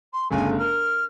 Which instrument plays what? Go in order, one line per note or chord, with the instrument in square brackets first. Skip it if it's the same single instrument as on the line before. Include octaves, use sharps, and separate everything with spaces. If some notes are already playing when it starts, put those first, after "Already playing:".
[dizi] C6
[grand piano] G1 C#3 A3 [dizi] G#5
[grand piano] A#4 [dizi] F6